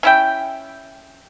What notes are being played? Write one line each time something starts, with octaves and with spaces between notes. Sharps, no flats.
C#4 E4 G5